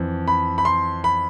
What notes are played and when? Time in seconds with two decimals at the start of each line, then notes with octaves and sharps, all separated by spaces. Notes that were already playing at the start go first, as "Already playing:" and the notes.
Already playing: F2 E3
0.28 B5
0.58 B5
0.65 C6
1.04 B5